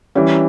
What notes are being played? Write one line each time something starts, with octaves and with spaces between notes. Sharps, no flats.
E3 G3 C#4